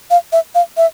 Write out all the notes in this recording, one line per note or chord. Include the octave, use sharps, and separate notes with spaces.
F5
E5
F5
E5